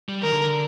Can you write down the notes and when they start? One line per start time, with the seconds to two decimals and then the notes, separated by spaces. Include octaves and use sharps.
0.09 G3
0.23 D#3 A#4
0.33 D3
0.44 D3